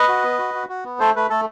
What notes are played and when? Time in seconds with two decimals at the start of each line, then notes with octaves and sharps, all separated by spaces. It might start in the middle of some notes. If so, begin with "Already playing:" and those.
Already playing: B4 D#5
0.09 F#4
0.24 B3
0.39 F#4
0.54 F#4
0.69 F#4
0.85 B3
0.99 A3 A4 C5
1.16 A3 B4
1.30 A3 A4